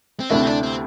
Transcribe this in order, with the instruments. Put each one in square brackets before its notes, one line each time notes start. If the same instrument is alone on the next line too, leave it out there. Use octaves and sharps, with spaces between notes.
[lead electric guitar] C4
[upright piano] D2 C3 A3 E4 [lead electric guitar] D4
[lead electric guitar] C4
D4
C4